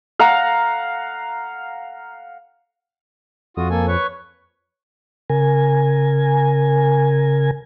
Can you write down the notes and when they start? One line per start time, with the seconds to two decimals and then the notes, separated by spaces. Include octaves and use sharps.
0.19 F5 F#5 A#5
3.57 F2 F4 F#4 D#6
3.70 A#3 A4 G#5
3.88 B4 C#5 C#6
5.30 C#3 A#4 G#5